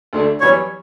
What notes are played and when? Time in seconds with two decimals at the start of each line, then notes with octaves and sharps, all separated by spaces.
0.13 D2 D3 A3 D4
0.41 F#2 E3 G3 B3 C#5